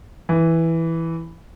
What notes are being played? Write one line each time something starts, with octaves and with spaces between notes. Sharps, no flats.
E3